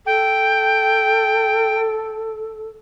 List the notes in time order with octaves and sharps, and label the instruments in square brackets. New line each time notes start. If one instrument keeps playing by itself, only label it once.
[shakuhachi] A4 [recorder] G5